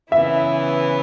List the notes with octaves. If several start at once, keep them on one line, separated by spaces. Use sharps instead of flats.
C#3 E3 B3 E4 E5